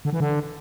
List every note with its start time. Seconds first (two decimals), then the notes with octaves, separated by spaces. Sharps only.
0.05 D3
0.13 E3
0.20 D3